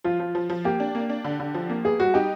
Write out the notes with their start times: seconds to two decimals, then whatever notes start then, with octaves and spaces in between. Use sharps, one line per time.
0.04 F3 F4
0.20 F3
0.35 F3
0.50 F3
0.64 A#3 G4
0.80 D4
0.95 A#3
1.09 D4
1.24 D3
1.40 D3
1.54 F3
1.69 A#3
1.85 B3 G#4
2.00 G3 F#4
2.14 D#4 G4